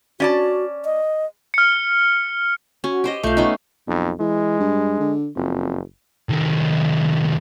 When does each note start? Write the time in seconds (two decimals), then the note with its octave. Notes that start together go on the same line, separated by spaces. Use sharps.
0.20 C#4 F#4 D5 A5
0.85 D#5
1.54 F6 C#7
2.84 C#4 F#4
3.04 G4 C5 D#5
3.23 B1 A3 F4 F5 G6
3.37 B3 C#4 D#4
3.87 B1 F2
4.20 E3 G#3
4.59 G2
5.00 D3
5.36 F#1 F2
6.29 C2 D#3